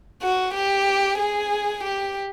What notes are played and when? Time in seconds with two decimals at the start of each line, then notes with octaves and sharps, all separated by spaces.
0.22 F#4
0.54 G4
1.18 G#4
1.84 G4